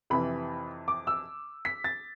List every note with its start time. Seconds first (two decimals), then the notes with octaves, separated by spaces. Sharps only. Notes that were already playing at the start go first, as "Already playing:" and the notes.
0.10 F2 C3 E3 B5
0.88 D6
1.07 E6
1.65 B6
1.84 A6